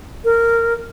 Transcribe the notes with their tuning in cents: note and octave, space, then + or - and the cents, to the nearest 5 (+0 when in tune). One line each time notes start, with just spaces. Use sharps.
A#4 -15